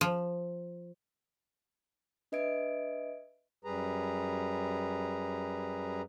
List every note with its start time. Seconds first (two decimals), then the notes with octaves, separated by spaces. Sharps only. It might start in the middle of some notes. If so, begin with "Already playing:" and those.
0.01 F3
2.32 D4 B4 D#5 E5 G#6 D7
3.65 F#2 G3 G#4 B4 A#5